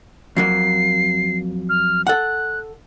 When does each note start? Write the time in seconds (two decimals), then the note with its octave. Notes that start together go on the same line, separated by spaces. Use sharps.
0.37 F2 F#3 A#3 C7
1.69 F6
2.07 A4 F#5 F#6